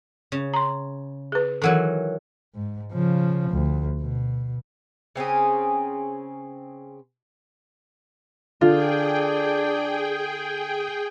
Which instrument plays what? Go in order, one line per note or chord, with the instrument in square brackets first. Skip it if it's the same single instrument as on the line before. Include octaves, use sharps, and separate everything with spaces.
[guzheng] C#3
[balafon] A#5 C6
G#4 B4
[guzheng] D#3 E3 F#3 [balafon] A4 F#5
[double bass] G#2
C#3 F3
D2
B2
[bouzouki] C#3 C4 C#4 G#4
[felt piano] D3 [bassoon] D4 [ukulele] F4 [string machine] G#4 G5